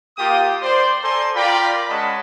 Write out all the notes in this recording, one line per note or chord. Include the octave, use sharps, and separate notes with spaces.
A#3 F4 G4 G5 D#6
C5 D5 C6
A4 C5 D5 G#5 A#5 C6
F4 A#4 D5 G5 B5
G#3 C#4 D#5 F#5 A5 B5